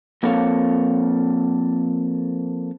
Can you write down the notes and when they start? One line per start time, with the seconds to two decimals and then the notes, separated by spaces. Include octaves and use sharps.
0.23 F3 A#3 C4 A4 C#5 F5